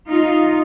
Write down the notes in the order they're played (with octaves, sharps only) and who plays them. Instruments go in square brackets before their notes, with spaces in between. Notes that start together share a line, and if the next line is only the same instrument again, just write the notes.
[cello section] D#4 F4